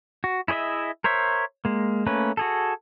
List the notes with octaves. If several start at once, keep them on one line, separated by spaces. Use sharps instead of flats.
F#4
E4 G#4 C5 D#5 E5
A#4 C5 C#5 E5
G#3 A#3
A3 A#3 C#4 B4
F#4 G#4 A4